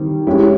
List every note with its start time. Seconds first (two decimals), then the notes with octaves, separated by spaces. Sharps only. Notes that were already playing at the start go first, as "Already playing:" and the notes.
Already playing: D#3 G3 C4
0.27 G#3 C#4 E4 G4